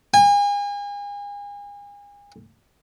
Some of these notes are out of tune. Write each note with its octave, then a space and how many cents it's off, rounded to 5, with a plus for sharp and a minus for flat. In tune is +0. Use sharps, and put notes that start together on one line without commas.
G#5 -35